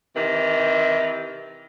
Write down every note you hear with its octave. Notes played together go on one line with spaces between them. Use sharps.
C3 D#3 E3